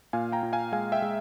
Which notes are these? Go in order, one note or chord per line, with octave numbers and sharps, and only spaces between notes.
A#2 F5 G#5
G5 A#5
A#2
F5 G#5
G#3 F5 G#5
E5 G5
G#3